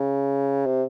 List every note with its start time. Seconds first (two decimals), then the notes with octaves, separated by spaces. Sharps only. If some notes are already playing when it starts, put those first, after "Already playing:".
Already playing: C#3
0.66 C3